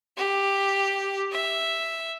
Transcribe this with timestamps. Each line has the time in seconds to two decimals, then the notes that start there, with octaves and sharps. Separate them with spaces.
0.17 G4
1.32 E5